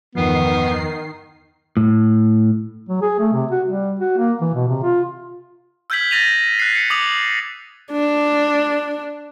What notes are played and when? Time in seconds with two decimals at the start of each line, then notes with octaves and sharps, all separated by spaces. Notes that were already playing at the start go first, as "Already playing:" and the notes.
0.15 E2 G2 D#3 F3 B3 C7
1.77 A2
2.89 F#3
3.02 G#4
3.20 A3
3.33 C3
3.51 F#4
3.67 G3
3.99 F#4
4.18 A#3
4.41 E3
4.54 B2
4.68 C3
4.83 F4
5.90 E6 F6 G6 G#6 B6 F#7
6.11 G6 A6 A#6 D#7 F7
6.59 F#6 C7
6.75 C#7
6.90 D6 D#6 F7 F#7
7.92 D4